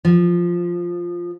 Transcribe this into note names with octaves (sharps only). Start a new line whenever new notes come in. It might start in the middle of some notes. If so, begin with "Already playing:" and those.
F3